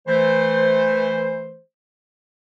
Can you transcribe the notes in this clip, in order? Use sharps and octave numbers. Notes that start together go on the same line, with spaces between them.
E3 A3 C5